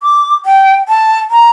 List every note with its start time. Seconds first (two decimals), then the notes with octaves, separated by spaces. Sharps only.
0.03 D6
0.46 G5
0.88 A5
1.31 A#5